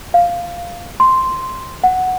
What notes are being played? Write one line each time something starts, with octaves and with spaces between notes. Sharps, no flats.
F5
C6
F#5